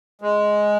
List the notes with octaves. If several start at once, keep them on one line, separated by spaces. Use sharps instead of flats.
G#3